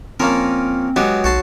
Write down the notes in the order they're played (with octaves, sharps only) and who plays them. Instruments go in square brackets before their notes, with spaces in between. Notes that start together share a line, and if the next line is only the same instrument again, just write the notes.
[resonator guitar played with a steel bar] F3 [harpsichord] A#3 C#4 A#4 [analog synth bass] C4
[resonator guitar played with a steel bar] F#3 [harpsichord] G#3 B3 G4
[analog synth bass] B1 [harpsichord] F#4 A5 C6